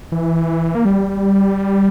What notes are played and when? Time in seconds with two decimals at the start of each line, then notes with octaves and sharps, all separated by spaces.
0.12 E3
0.75 A#3
0.85 G3